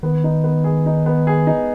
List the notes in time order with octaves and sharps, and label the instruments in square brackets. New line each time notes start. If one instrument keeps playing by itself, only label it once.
[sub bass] D#3 [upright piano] B3
[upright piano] D#4
B3
G#4
D#4
B3
G#4
D#4